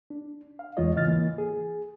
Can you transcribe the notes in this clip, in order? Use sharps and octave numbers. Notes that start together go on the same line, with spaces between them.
D4
F5
E2 E3 G#3 F4 C#5 D#5
G#2 C#3 E3 D#5 F6 A6
E3 A#3
G#4